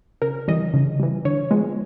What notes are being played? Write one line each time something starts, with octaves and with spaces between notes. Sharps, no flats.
C#3 A#4
E3 G3 D#5
C#3
E3 G3
D3 C#5
F3 G#3 B3